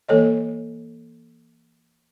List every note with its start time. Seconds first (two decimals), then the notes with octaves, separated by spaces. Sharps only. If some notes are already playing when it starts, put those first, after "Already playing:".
0.08 E3 A#3 A4 C#5 D#5